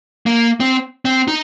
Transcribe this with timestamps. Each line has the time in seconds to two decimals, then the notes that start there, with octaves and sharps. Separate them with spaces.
0.26 A#3
0.60 C4
1.05 C4
1.28 D#4